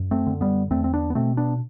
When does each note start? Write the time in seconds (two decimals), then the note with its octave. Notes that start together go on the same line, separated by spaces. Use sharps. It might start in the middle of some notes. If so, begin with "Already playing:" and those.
Already playing: F#2
0.11 A3 C4
0.26 D3
0.41 G3 B3
0.71 E2 A3 C4
0.84 C4
0.93 B3 D4
1.10 B3
1.15 B2 A3 C4
1.37 B3 D4